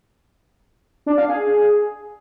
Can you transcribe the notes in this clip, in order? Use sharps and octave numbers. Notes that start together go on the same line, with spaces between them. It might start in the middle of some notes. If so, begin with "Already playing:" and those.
D4
F5
G#4